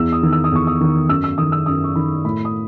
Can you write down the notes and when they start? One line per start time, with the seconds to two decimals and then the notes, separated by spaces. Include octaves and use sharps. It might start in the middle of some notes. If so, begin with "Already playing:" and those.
Already playing: E2 E6
0.13 D#6
0.22 D#3
0.32 E6
0.44 D#6
0.52 E2 C#6
0.67 D#6
0.80 D#3
1.09 F#2 E6
1.24 E6
1.38 D#3 D#6
1.52 E6
1.66 F#2 D#6
1.84 C#6
1.95 D#3 B5
2.25 A2 B5
2.45 D#6